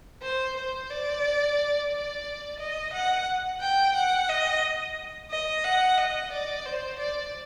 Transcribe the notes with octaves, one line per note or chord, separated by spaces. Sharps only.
C5
C5
D5
D5
D#5
F#5
G5
F#5
D#5
D#5
F#5
D#5
D5
C5
D5